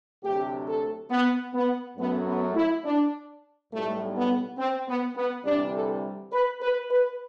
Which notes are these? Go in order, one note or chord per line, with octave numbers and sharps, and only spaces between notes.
D2 C3 F#3 A3 G4
A4
B3
B3
F#2 F#3 A3 B3
B3
E4
D4
B1 A2 G3 A3
B3
C4
B3
B3
D2 C3 E3 G3 D4
A4
B4
B4
B4